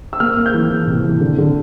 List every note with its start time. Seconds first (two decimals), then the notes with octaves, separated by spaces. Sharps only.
0.13 E6
0.20 A#3 F6
0.37 A#3
0.46 G6
0.54 E3
0.70 E3
0.87 C3
1.04 E3
1.21 D3
1.38 D3